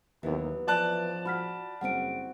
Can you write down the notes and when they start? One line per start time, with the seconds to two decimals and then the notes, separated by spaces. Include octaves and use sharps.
0.23 D#2 E3 F#3 B3
0.67 F3 D5 A5 F#6
1.25 F#4 B5 F6 B6
1.81 F#1 G3 C4 F#4 F#5 D7